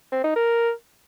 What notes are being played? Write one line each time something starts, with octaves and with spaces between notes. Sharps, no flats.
C4
D#4
A#4